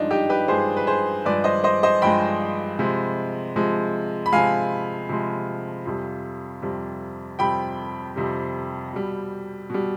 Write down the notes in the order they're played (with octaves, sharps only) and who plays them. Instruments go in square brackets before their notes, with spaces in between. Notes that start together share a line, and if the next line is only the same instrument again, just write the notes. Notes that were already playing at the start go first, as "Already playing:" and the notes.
Already playing: [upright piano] G2 F3 G#3 D4 D#4
D#4 G4
G4 B4
G2 F3 G#3 G#4 C5
B4
G#4 C5
G2 F3 G#3 B4 D5
C5 D#5
C5 D#5
C5 D#5
G2 F3 G#3 G5 B5
C3 F3 G#3
C3 F3 G#3
B5
C3 F3 G#3 F5 G#5
C3 F3 G#3
F2 C3 G3
F2 C3 G3
F2 C3 G3 G5 B5
F2 C3 G3
B2 G3
B2 G3